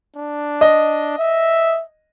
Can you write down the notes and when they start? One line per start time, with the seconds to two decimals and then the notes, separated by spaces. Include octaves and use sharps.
0.16 D4
0.61 D#5
1.19 E5